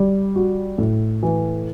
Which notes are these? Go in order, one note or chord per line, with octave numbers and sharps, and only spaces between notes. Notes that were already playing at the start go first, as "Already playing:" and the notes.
Already playing: G3
F#4
A2
E3